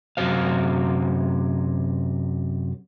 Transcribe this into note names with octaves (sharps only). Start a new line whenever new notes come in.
F#2 C3 F#3 C5 F5